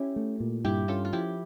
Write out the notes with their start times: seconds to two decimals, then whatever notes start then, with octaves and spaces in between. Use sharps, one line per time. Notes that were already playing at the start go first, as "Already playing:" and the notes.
Already playing: C#4 E4 G4
0.16 A3
0.40 A#2
0.65 G2 E4 G4
0.88 C#4 F4 A4
1.05 F4
1.13 F3 E4 G4